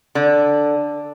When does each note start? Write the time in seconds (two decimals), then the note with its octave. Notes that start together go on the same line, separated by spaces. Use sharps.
0.15 D3